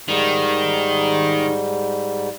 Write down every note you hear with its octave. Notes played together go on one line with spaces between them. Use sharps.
G#2 D#3 G3